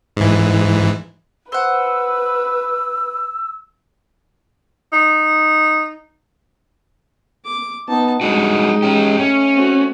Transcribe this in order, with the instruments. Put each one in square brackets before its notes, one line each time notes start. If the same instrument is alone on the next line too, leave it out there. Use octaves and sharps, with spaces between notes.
[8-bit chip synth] G#2 E3
[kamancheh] B4 [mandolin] C5 F#5 [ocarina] E6
[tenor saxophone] D#4
[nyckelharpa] D6
[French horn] B3 [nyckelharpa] D#4 A5
[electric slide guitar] G3 D4 F#4 [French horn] G#3 [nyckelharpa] D#4
[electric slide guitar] C#4 G4
[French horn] A3 [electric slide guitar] C#4
[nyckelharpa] C4 F#4